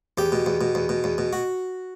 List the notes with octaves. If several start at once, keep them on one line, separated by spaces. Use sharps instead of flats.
E2 G4
B2
E2
B2
E2
B2
E2
B2
F#4